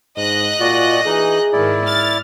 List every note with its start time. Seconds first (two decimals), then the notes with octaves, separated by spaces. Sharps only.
0.17 G#2 D#5 F#6 A#6
0.60 A#2 F4 F#4 D5
1.06 E3 D#4 G#4
1.53 G#2 D#3 E4 D5
1.86 F6 A6